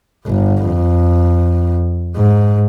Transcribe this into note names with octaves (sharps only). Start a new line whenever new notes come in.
G1
F2
G#2